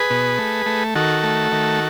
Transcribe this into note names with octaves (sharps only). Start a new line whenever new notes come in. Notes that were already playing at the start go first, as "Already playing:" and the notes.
Already playing: G#4 B4
B2
A3
A3
D#3 F#4 A4
A3
D#3